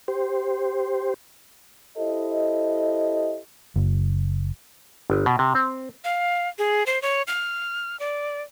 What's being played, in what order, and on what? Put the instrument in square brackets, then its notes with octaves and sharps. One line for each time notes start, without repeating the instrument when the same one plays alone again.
[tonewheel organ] G4 C5
[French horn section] E4 G4 A4 C5 D#5
[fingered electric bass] F#1
[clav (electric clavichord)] G1
B2
C3
C4
[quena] F5
G#4
C5
C#5
F6
D5